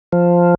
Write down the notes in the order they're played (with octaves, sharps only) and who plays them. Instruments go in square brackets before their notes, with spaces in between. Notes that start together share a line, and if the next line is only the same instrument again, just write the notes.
[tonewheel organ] F3